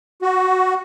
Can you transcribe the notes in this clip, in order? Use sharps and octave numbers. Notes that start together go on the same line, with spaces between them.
F#4